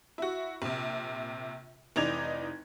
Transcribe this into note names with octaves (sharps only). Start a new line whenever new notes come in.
E4 F#4
A#1 C3
F1 E3 D#4 D5 G#6 F7